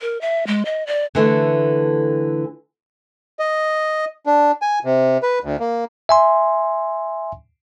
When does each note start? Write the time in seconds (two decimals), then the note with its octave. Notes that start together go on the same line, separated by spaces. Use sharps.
0.01 A#4
0.21 E5
0.47 G#3
0.65 D#5
0.87 D5
1.15 D3 E3 A3
3.39 D#5
4.26 D4
4.62 G#5
4.85 C3
5.23 B4
5.44 D2
5.60 A#3
6.09 E5 G#5 C6